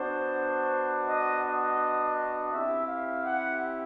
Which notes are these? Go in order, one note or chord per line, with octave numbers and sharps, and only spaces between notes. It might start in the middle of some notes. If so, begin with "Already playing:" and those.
Already playing: B3 D4 F#4 C5
D#5
D#5
C4 E4 G4 E5
F5
F#5